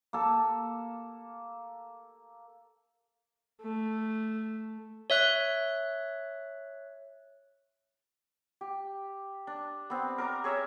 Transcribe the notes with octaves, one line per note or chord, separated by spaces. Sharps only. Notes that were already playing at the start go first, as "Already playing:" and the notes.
A#3 A4
A3
C#5 E5 F#6
G4
D4
B3 C4
A#4 A#5 D6
G#4 C#5 E5 A#5